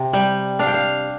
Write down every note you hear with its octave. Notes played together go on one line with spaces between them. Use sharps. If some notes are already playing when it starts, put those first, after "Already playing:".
Already playing: C3
G3 G5
D4 F5
G5
F5